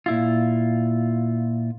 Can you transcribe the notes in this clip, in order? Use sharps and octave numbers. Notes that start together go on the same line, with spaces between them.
A#2 E4 F4